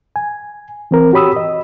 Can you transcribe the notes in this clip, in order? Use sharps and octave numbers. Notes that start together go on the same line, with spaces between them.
G#5
E3 C4 A#4
F#4 G4 C#5 B5 D#6 E6
D#5